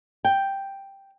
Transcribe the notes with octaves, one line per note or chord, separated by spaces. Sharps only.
G5